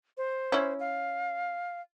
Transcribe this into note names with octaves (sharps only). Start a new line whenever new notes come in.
C5
C#4 E4
F5